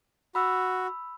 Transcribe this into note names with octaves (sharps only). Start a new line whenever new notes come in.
F#4 B5 E6